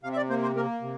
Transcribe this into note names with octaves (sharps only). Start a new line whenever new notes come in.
C3 F5
E5
D5
A#3 C5
C5
A#3 A#4
C3